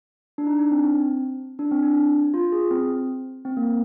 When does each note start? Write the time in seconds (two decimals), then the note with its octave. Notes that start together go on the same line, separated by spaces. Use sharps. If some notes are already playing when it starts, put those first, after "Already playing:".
0.38 D4
0.47 D#4
0.59 D4
0.71 C4
0.84 C4
1.59 D4
1.71 C4
1.82 D4
2.34 F4
2.52 G#4
2.71 C4
3.45 C4
3.57 A#3